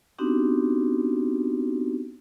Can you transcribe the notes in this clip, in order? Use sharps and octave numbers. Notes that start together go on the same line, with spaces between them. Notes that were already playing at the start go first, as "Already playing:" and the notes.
B3 C4 D4 D#4 F#4 G4